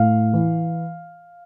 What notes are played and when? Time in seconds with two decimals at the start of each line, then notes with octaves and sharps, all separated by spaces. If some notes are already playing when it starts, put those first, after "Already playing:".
Already playing: A2 F5
0.33 E3